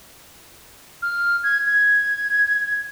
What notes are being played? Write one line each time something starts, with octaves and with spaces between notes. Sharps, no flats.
F6
G#6
G#6